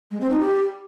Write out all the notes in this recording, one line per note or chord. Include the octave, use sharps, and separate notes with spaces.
G#3
C4
D#4
G4